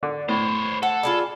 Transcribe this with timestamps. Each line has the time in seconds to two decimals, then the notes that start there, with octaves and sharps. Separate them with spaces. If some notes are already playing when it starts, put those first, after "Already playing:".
0.03 D3 D5
0.29 A2 C5 C#5 B5
0.83 A4 F#5
1.03 F4 G#4 D5 B5